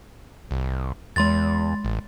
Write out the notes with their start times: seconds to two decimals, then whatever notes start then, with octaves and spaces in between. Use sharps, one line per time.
0.51 C2
1.16 E2 G#3 C6 A6
1.85 A1